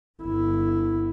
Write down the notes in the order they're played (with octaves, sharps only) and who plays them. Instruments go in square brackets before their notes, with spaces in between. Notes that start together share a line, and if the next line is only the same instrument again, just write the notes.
[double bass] G1 E4